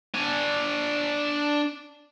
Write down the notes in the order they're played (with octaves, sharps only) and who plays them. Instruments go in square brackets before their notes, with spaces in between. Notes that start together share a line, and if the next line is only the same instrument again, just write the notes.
[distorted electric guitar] D4 G#5